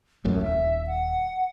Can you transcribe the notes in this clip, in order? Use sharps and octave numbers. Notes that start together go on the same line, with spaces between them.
D1 A1 F#2 A3
D#1 E5
F#5